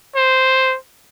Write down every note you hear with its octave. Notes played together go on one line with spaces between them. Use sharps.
C5